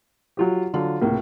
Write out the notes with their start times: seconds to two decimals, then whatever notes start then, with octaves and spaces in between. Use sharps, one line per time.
0.37 F#3 F4 G4
0.74 D3 F#3 F4
1.01 C#2 A2 C3 A#3